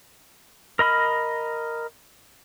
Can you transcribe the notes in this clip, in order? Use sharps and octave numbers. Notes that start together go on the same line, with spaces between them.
A#4 D#5 B5 F6